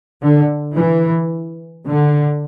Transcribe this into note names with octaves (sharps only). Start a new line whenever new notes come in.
D3
E3
D3